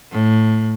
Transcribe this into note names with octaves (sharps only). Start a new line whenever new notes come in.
A2